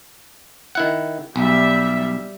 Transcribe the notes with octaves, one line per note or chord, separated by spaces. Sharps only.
D#3 E4 F#5
B1 G3 E5